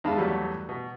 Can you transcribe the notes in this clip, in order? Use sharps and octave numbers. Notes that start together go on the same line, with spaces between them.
E2 D#3 G#3 F5 A5 B5
E2 F#3 G3 A3
B2